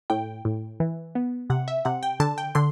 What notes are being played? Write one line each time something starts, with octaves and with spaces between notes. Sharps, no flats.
A2 G5
A2
E3
B3
C3 F#5
E5
C3 F#5
G5
D3 A5
G5
D3 C6